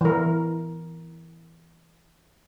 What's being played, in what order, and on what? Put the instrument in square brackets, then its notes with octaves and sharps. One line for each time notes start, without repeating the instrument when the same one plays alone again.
[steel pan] E3 A#4